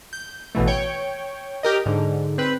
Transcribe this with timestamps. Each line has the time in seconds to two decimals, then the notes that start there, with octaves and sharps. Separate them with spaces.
0.13 G6
0.55 A1 B2 E3 A3
0.67 C#5 G5
1.63 G4 A#4 D#5
1.86 G#2 D3
2.38 C4 B4